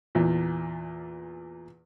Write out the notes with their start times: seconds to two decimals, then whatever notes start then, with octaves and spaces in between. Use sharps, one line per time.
0.15 E2 A#2